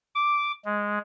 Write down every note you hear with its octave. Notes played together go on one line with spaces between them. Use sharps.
D6
G#3